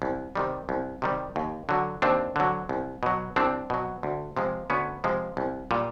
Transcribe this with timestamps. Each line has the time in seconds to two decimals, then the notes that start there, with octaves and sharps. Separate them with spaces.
0.02 C2
0.36 C3 D#3 G3
0.69 C2
1.02 C3 D#3 G3
1.36 D#2
1.69 D3 F#3
2.02 D#2 C4 D4
2.36 D3 F#3
2.69 C2
3.03 B2 F#3
3.36 C2 C4 D4
3.70 B2 F#3
4.03 D2
4.37 C3 F3 G#3
4.70 D2 B3 C#4
5.04 C3 F3 G#3
5.37 C2
5.71 A#2 G3